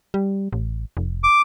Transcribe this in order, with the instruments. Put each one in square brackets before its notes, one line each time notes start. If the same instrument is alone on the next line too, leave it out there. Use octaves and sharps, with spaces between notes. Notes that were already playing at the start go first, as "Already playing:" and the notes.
[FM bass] G3
A1
F1
[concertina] D6